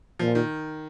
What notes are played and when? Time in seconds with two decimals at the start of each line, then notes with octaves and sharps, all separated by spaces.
0.19 A#2 F3
0.35 D#3